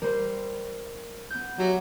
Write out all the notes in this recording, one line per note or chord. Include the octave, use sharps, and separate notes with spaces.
G3 A#4 C5
B3 G6
F#3 G4 E5 F#5